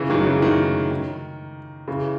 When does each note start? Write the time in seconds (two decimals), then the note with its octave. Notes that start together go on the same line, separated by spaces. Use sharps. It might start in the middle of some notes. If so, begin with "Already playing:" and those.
Already playing: C#3 E3
0.10 D#3 F#3
0.26 C#3 E3
0.42 D#3
0.91 D#3
1.88 C#3 E3